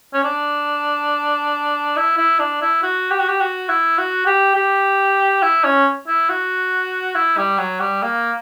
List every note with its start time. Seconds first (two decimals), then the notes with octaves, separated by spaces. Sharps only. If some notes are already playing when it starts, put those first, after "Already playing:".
0.14 C#4
0.24 D4
1.97 E4
2.18 E4
2.39 D4
2.62 E4
2.83 F#4
3.11 G4
3.20 F#4
3.29 G4
3.41 F#4
3.69 E4
3.98 F#4
4.26 G4
4.56 G4
5.42 E4
5.64 C#4
6.07 E4
6.29 F#4
7.15 E4
7.37 G3
7.58 F#3
7.80 G3
8.02 A#3